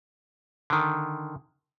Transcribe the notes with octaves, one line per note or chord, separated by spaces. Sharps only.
D3 D#3